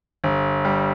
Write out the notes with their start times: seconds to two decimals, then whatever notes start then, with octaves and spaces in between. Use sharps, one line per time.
0.24 G1
0.65 G3